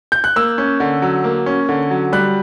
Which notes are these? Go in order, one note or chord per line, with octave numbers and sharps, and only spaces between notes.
G6
F#6
A#3 E6
C#4
D3
F#3
A#3
C#4
D3
F#3
G3 F#6